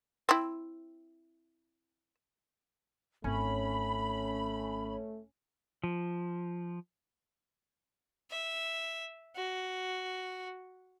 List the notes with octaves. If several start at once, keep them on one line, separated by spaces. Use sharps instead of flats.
C4 E4
G#1 A3 C#4 B5
F3
E5
F#4